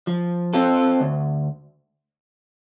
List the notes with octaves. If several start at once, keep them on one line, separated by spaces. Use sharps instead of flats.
F3
C4 F4 A4
D2